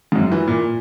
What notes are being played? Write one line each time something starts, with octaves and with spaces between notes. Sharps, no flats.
G#2
F#2
E3
A#2